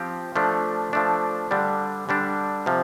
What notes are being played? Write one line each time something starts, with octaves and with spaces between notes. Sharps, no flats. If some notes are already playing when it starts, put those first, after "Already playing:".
Already playing: F3 C4 G4
F3 A3 D4
F3 A3 D4
D3 G3 D4
D3 G3 D4
C3 F3